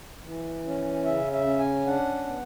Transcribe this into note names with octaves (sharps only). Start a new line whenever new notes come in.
E3
C#4
C#3 E5
E5
C#4
G#5
D4 F#5
B3